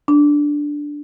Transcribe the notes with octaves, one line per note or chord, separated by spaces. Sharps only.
D4